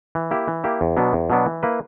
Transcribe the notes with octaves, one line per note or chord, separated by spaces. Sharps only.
E3
A#3 E4 G4
E3
A#3 E4 G4
E2
B2 F#3 B3 D4
E2
B2 F#3 B3 D4
E3
A#3 E4 B4